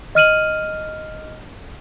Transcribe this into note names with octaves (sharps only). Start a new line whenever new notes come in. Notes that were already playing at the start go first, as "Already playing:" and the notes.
D#5 F6 D#7 F#7